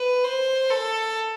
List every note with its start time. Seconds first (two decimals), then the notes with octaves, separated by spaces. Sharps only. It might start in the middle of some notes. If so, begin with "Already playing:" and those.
Already playing: B4
0.23 C5
0.70 A4